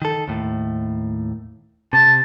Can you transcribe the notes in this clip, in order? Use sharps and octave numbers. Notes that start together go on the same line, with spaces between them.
D#3 A4
D#2 A2
C3 A5